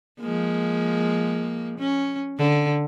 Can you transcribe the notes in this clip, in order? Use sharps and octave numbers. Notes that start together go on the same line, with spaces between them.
F3 G#3 A#3
C#4
D3